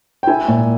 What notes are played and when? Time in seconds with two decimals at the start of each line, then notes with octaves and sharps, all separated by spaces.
0.23 G5
0.27 E4 G#5
0.48 A#2